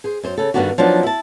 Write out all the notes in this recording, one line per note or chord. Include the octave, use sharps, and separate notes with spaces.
G#4 C5
F#2 C5
C#3 A4
G2 D3 D#3 B3 D4 F#4
F3 F#3 B3 D4 D#4
E4 A5